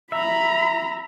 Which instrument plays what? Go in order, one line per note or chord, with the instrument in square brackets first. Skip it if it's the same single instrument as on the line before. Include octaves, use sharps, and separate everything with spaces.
[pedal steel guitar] E5 [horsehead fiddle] A#5 B5